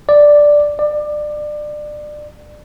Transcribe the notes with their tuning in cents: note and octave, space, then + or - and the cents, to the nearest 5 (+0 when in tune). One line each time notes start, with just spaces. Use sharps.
D5 +0
D5 +25